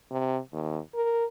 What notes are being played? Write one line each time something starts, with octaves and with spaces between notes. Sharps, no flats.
C3
D#2
A#4